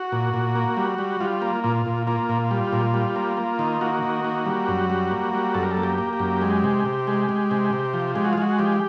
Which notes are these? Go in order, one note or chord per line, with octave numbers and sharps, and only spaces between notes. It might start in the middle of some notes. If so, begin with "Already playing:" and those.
Already playing: F#4
A#2
A#2
A#3
G3
G3
G3 F4
A#3
A#2 F4
A#2
A#3 F4
A#2
G3
A#2
G3
A#3
A#3
D#3
A#3 F#4
D#3
A#3
G3
F#2
G3
A#3
G3
F#2 A4
A#4
A4
A#3
G4
A#3
G4
F#2
G#3
C3
C3
G#3
G#3
C3
C3
F3
G#3 G4
F#4
F4
G#3 F#4
F3 G4